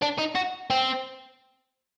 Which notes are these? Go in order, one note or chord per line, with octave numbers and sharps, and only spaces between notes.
D4
D#4
F#4
C4